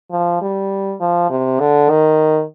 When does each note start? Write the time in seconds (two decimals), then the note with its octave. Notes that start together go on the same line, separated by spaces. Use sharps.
0.11 F3
0.41 G3
1.00 F3
1.30 C3
1.60 D3
1.89 D#3